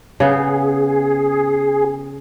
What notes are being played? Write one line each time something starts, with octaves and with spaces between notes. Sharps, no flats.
C#3 B3 G#4